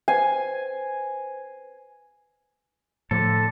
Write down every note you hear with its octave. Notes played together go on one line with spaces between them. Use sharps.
B4 C5 G#5 C7
A2 D3 F3 A4